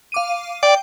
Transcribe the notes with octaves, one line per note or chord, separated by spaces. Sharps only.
F5 D6 D#7
D5 G5